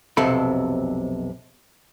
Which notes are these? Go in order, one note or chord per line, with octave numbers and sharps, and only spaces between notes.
B1 F2 C3 C4 A4 B5